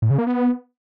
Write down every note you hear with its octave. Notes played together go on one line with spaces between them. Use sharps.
A2
C#3
A#3
B3